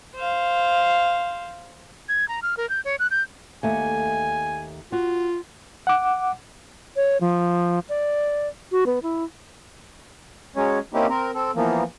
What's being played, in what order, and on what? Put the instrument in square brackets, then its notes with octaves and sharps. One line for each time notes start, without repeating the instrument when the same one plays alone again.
[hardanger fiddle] C5 F5
[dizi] G#6
A#5
F6
A#4
G6
C#5
F#6
G6
[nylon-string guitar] D#2 A3 [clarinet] G#5
[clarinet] F4 [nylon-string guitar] F#4
[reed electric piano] F#5 D6
[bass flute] C#5
F3
D5
F#4
B3
E4
[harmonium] F#3 G#3 C#4 C#5
A#3 C4 C#4 D#4 E4 G4
C4 A#4
C4 A4
E3 F3 A#3 B3